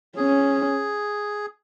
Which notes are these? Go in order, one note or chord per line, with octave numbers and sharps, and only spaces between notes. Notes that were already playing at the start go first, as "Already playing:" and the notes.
C#4 G#4